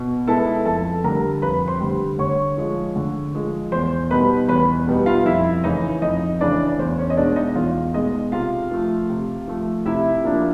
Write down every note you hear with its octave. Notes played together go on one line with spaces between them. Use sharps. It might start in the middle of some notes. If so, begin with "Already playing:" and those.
Already playing: B2
G#3 B3 E4 A4 A5
F2 A4 A5
D3 G3 A#4 A#5
F2 B4 B5
C5 C6
D3 G3
D3 C#5 C#6
F3 G#3
D3
F3 G#3
E2 C5 C6
B2 G3 B3 D#4 B4 B5
E2 B4 B5
B2 G3 B3 D#4
F4 F5
F2 E4 E5
C#3 E3 D#4 D#5
F2 D#4 D#5
C#3 E3 D4 D5
E2 C5
C#4 C#5
D#5
B2 G#3 D4 D5
D#4 D#5
E2 F4 F5
B2 G#3 D#4 D#5
C3 F4 F5
F3 A3
C3
F3 A3
C3 E4 E5
F3 A#3 D4